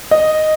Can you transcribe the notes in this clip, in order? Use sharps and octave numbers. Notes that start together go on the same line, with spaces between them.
D#5